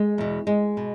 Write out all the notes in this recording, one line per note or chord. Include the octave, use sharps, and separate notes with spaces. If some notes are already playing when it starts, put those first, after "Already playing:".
Already playing: G#3
E2 B2
G#3
B2